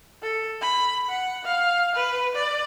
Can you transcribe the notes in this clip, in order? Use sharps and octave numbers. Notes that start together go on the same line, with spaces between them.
A4
B5
F#5
F5
B4
D5